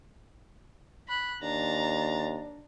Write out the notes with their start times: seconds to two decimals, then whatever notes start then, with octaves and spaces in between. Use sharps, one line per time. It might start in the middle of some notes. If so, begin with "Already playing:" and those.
1.08 B5 F#6
1.42 D#2 D4 A#5 A6